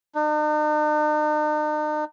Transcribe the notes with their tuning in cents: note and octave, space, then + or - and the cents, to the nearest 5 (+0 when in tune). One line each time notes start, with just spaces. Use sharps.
D#4 -45